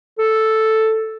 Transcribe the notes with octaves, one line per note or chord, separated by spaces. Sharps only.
A4